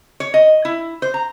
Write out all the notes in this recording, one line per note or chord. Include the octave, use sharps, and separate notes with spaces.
C#5
D#5
E4
C5
A#5